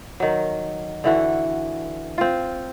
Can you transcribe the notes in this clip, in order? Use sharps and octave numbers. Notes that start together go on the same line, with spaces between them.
D#3 F#3
D3 E3 F#4
C4 F4